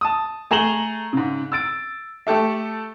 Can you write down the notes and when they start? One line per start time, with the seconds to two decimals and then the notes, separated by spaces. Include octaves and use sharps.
0.01 A5 D#6
0.51 A3 G#4 A#5 E7 F#7 G7
1.13 G#2 C#3
1.52 E6 A6 D7
2.27 A3 G4 A4 E5